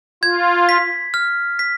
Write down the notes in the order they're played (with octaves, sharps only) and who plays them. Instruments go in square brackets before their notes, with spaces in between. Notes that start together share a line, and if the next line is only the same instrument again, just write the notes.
[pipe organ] F4 [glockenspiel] G#6
[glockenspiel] B6
F6
B6